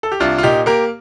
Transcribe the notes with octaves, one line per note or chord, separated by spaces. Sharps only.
A4
G4
C2 D4 F4
F4
A#2 D#4 G4
A#3 G4 A#4